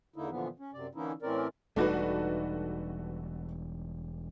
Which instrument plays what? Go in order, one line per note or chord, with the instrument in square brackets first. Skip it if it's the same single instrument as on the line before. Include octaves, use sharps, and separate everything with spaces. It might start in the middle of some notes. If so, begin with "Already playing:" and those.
[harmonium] E2 D3 A#3 D#4 E4
A#2 D3 E3 F3 B3
C#4
F#2 C3 D5
D3 E3 A#3 C#4 D#4 E4
A2 E3 C4 C#4 A#4 D5
[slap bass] E1 G3 [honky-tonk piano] A3 F#4 B4 [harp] D4 D#4